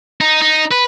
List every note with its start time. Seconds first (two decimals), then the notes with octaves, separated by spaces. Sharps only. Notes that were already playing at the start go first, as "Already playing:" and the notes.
0.21 D#4
0.42 D#4
0.72 B4